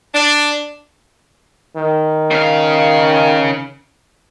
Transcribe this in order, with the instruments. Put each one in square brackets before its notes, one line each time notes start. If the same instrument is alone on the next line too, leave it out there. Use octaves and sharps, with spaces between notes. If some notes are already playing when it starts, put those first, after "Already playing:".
[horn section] D4
[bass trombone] D#3
[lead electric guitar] C#3 F5